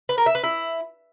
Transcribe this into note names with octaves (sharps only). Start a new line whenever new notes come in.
B4
A#4
E5
B4
E4